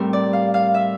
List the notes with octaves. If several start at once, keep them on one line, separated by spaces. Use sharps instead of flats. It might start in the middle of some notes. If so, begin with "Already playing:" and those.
Already playing: A2 G3 C4 A#4
D5
F5
F5
E5